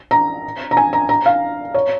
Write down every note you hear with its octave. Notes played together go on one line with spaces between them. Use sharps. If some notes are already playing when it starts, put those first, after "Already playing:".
A#5
A#5
G#5
A#5
A#5
F5
C#5